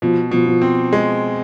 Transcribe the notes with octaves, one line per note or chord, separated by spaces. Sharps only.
B2 F3
B2 F3
F3
C4
G#3